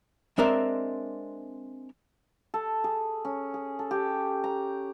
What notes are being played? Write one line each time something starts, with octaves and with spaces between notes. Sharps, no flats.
G#3 C4 D4 A#4 D5 E5
A4
G#4
C#4
G#4
A4
G4
A#5